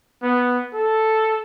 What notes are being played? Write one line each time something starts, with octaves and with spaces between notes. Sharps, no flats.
B3
A4